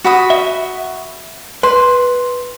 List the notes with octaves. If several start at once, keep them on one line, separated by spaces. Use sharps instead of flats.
F#4 B5 D#6
E5
B4 C6